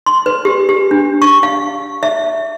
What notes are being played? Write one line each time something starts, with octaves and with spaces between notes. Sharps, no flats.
C6
B4
G4
G4
D4
C#6
F5
E5